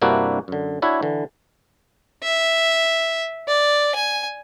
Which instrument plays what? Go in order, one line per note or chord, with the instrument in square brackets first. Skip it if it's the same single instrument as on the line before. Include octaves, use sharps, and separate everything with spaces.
[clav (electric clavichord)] G2 C3 A#3 D4 E4 F#4
F#2 D3
D4 E4 F#4 C#5 E5
D3 E3
[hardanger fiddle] E5
D5
G#5